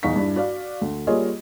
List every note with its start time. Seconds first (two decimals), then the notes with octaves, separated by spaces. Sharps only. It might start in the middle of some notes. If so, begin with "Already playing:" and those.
0.03 D#1 E2 D#4 F5 C#6 B6
0.16 G2 D4 E4
0.36 F#4 D5 F5
0.81 D2
1.07 G3 A#3 F4 G#4 C#5 D#5